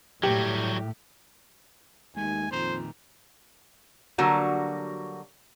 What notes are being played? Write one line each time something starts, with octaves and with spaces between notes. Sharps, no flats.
A2 F#3 G3 G4
D#2 G#3 A3 G#5
F2 A#2 D#3 C5 A#5
D3 F#3 G3 A#3 F#4